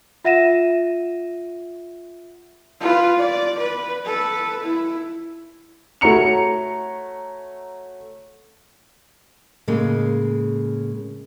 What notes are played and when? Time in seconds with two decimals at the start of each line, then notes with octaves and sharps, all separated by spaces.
0.24 F4 E5 F#5 A#6 D#7 E7
2.81 F4 B4
3.17 D5
3.59 B4
4.05 A4 B4
4.63 E4
6.01 A3 F#4 C#5 A#5 C#7 F7
9.68 A2 C#3 G#3 A#3